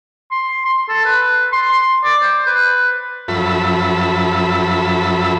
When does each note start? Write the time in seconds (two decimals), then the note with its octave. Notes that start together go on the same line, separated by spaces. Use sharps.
0.31 C6
0.65 C6
0.89 A4
1.06 B4
1.53 C6
2.04 D5
2.22 C5
2.47 B4
3.28 F#2 F3 A4 E5 B5